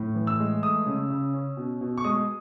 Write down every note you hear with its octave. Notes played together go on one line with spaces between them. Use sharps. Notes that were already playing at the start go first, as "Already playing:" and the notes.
Already playing: A2
E3
E6
G#3
A3 D#6
C#3
C#3
C#4
B2
B2
C#6
G#3 D#6